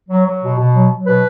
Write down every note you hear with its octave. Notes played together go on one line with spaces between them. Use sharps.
F#3
F#3
B2
B2
F#3
F#3
B2 B4